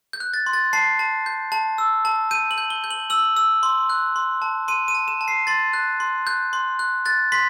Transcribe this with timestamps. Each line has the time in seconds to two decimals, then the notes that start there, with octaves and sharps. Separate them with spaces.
0.13 G6
0.20 F#6
0.34 A6
0.46 C6
0.53 A6
0.73 A5 C7
0.99 A5
1.26 G6
1.52 A5
1.78 E6
2.05 A5
2.31 G6 D#7
2.51 F#7
2.58 G6
2.70 G7
2.84 G6
2.91 F#7
3.10 E6 F#7
3.36 E6
3.63 C6
3.90 F#6
4.16 C6
4.42 A5
4.68 C6 D#7
4.88 D#7
4.95 A5
5.08 E7
5.21 A5
5.28 C7
5.47 C6 A6
5.73 F#6
6.00 C6
6.27 F#6 G6
6.53 C6
6.79 F#6
7.05 F#6 A6
7.32 C6 B6